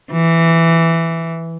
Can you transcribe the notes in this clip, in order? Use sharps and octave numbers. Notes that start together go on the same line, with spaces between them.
E3